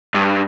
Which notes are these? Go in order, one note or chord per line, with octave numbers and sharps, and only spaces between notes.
G2